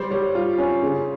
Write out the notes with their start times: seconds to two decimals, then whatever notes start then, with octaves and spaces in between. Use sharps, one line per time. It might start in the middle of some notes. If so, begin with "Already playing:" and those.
Already playing: G3 C5
0.11 G3 C#5
0.35 F4
0.58 C#4
0.82 C#3